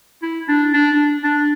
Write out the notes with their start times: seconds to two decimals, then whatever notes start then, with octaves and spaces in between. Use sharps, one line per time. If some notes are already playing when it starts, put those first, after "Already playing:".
0.23 E4
0.49 D4
0.74 D4
1.24 D4